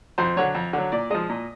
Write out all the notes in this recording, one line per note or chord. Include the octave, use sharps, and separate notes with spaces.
F2 C5
D3 F#3 C#5
F2
D3 F#3
A#2 D5
F3 G#3 D#5
A#2